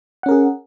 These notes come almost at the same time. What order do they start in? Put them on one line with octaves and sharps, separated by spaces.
F#5 C#4 A#4 G#4